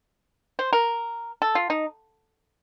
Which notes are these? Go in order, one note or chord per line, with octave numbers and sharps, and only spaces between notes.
C5
A#4
A4
F4
D#4